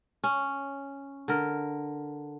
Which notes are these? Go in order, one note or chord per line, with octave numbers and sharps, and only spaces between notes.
C#4
D3 A#4